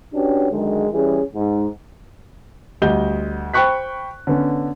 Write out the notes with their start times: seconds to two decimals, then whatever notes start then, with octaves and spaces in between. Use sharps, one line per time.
0.14 C#4 D4 F#4 G4 B4 C#5
0.51 F#2 D3 D#3 G#3
0.93 E3 G3 C#4 G#4
1.35 G#2
2.82 D2 G3 D#5 G6 G7
3.54 C5 G5 B5 C#6 F#6 B6
4.27 D3 B3 C#4